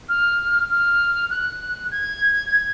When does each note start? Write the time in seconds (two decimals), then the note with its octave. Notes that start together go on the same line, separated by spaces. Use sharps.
0.09 F6
0.70 F6
1.31 F#6
1.92 G#6